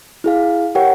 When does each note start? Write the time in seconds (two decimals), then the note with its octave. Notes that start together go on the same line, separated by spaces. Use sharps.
0.24 E4 G#4 F5
0.75 G4 A#4 C#5 F#5 G5